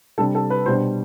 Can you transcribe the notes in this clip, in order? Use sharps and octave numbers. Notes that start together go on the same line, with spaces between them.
C3 G3 D4 A4
A4
B4
B2 G3 D4 C5